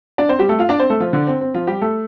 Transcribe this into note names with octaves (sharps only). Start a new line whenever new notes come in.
D4 D5
C4 C5
G3 G4
A3 A4
F4 F5
D4 D5
C4 C5
A3 A4
F3 F4
D3 D4
C4
C4
F3 F4
G3 G4
A3 A4